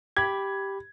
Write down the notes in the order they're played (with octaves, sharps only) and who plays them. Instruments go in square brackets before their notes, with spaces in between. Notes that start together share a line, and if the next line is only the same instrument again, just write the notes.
[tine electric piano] G4 B5 [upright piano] G#6